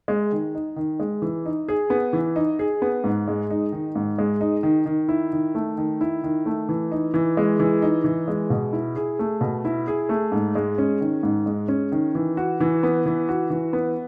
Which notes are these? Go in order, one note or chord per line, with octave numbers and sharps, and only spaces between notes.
G#3
D#3
D#4
D#3
G#3
E3
D#4
G#4
B3
E3
D#4
G#4
B3
G#2
G#3
D#4
D#3
G#2
G#3
D#4
D#3
D#3
E4
D#3
A3
D#3
E4
D#3
A3
E3
D#4
E3
G#3
E3
D#4
E3
G#3
B2
E4
G#4
A3
B2
E4
G#4
A3
G#2
G#3
C#4
D#3
G#2
G#3
C#4
D#3
E3
F#4
E3
B3
E3
F#4
E3
B3